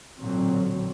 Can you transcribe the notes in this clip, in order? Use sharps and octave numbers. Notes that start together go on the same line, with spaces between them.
A1 A#2 D3 F#3 C4